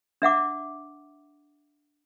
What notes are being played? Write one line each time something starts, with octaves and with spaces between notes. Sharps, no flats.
D4 E5 F#5 D6